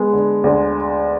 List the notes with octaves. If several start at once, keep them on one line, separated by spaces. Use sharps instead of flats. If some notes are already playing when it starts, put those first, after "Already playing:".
Already playing: G#3 B3
D3
D2